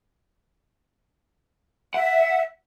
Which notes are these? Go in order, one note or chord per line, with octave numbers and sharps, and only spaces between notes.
E5 F#5